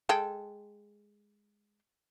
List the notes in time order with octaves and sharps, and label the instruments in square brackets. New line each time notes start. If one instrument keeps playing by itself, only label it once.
[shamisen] G#3 A4 G5